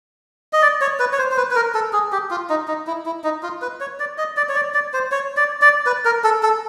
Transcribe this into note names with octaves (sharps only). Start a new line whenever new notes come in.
D#5
D5
C#5
B4
C#5
C5
C5
B4
B4
A#4
A4
G#4
G4
F4
D#4
D#4
E4
E4
D#4
F4
B4
C#5
D5
D#5
D5
C#5
D5
D5
C5
C#5
D5
D5
B4
A#4
A4
A4